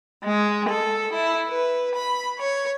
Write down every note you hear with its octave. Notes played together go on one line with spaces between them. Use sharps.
G#3
A4
E4
B4
B5
C#5